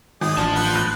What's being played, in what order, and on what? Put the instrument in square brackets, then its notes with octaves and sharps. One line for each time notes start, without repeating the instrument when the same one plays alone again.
[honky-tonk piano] G#1 [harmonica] G#3 D5 D#6
[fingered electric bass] A1 [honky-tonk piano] D4 [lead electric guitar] F4 A5
[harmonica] B4 C5 F#5
[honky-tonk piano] F#6